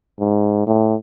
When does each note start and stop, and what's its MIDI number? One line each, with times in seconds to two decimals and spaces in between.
0.20 0.64 44
0.67 0.95 45